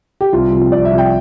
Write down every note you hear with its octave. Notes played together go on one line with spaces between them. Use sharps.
G4
C2 F4
C3 F3
C2 D5
E5
C3 F3
G5